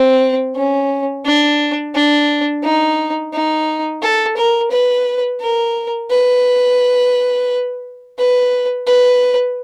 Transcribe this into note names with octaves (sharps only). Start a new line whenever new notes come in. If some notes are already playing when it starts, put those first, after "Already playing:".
Already playing: C4
C#4
D4
D4
D#4
D#4
A4
A#4
B4
A#4
B4
B4
B4